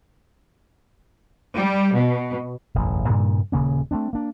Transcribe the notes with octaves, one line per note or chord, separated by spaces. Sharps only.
G3
B2
E1 A1 F#2
G2 A#2 C#3 G3
D#1 C#3 A#3 C#4
A3 A#3 C4 D4
A#3 D4